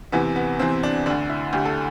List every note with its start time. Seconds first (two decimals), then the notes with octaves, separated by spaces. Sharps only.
0.12 E2 C3 E3 B3
0.36 B3
0.59 E2 C3 E3 C4
0.83 D4
1.06 D2 D3 D4
1.29 E4
1.53 D2 D3 G4
1.65 A4